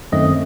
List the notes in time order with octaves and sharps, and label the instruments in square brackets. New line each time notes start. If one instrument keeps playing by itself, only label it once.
[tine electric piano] F#2 D#3 A3 C4 D#5